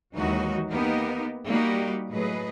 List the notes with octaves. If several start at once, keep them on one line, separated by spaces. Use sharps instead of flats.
D#2 E3 F#3 G#3 D#4 F#4
A#3 B3 D#4 G4 A#4
G3 A#3 D#4 F#4 G4
A2 F#3 G#4 B4 D#5